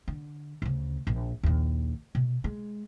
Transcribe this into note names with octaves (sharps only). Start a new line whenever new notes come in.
D3
D2 C#3
A#1
A#1 D#2
B2
G#3